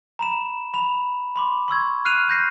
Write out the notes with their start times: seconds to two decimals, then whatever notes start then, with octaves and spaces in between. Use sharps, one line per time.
0.19 A#5 B5 E7
0.74 B5 F7
1.36 B5 C6 D6
1.68 C6 C#6 E6 G#6
2.05 F6 F#6 C7 D#7 F7
2.28 F6 G6 A#6 C7